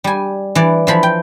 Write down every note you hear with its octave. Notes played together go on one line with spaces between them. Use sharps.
G3 G#5
E3 D5
E3 F3 B5
G5